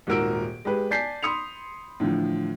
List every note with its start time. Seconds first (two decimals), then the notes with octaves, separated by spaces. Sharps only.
0.07 D#1 G#2 F#4 A#4 E6 D7
0.65 G#3 G4 B4
0.91 D5 G#5 A5 G6 B6 C7
1.23 B5 C6 D#6 C#7 F7
2.00 A2 D3 E3 F3